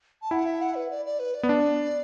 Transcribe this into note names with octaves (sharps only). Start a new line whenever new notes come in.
A5
E4 F#5
E5
F#5
B4
D5
D5
B4
D5
B3
D4